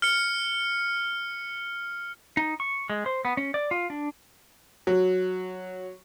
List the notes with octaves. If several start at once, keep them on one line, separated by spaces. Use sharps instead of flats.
F6 C#7
D#4
C#6
G#3
C5
B3
C#4
D5
F4
D4
F#3